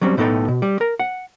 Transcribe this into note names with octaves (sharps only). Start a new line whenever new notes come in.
F#3 G3 C4 C#4
B1 A2 B3 D#4 A4 G5
B2
G3
A#4
F#5